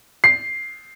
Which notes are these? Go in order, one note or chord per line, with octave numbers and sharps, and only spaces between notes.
C7